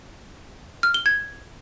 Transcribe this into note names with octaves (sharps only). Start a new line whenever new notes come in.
F6
G7
G#6